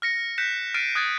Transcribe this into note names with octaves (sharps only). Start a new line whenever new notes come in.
F6 A#6 C#7
F#6 G6 A#6 B6 C#7 E7
F6 A6 B6 C7 D7 D#7
D#6 F#6 G#6 A6